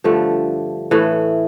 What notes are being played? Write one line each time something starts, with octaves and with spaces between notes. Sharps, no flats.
G2 D3 F3 A3
A2 E3 A3